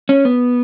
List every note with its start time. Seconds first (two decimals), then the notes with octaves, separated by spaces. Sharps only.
0.09 C#4
0.25 B3